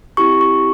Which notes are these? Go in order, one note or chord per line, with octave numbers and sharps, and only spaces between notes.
C4 E4 G4 C#6
C#6